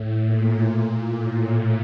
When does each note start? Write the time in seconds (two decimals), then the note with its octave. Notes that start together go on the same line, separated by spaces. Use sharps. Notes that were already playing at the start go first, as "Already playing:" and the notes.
Already playing: A2
0.21 A#2
1.10 A2